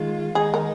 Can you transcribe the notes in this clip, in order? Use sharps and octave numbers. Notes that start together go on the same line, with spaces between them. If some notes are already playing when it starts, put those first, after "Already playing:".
Already playing: D#3 G#3 F4
D#3 G#3 D#4 G#4
A#4